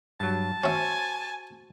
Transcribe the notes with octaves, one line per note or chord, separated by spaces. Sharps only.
G2 F#3 A5
C#4 F#4 C5 E5 G#5